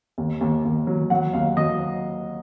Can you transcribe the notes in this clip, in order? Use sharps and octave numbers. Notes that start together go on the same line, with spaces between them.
D#2
D#2
D#2
F#3
F#3 F#5
D#2 F5
F#3 D#5